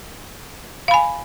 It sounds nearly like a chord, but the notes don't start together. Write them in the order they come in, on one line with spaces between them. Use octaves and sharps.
F5 B5 G#5